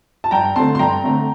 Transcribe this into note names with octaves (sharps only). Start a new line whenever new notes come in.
A5
G2 G5 A#5
D3 A3 C4 A5 C6
C6
G2 G5 A#5
D3 A3 C4